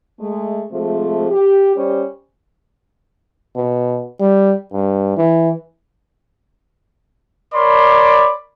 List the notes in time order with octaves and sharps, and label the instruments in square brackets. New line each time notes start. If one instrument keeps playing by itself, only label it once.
[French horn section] G#3 A3
C3 F3 G#3 A3
G4
G3 C#4 G4 C5
[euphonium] B2
G3
G2
E3
[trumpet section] A#4 C#5 D5 B5 C6 D6